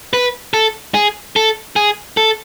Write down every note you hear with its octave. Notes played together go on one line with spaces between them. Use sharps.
B4
A4
G#4
A4
G#4
A4